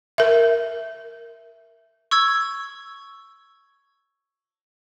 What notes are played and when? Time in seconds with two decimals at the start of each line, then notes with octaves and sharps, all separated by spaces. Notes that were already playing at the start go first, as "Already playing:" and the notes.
0.18 A#4 E5
2.11 C#6 E6 G#6